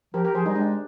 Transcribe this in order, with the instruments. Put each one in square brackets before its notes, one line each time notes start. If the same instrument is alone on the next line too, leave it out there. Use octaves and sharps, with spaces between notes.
[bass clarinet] F3 [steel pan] G4 A#4
[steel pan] G4 A#4
[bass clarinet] F3 [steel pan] G#4 C5
[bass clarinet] G3 [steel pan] D#4
[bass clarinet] G#3 [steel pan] D4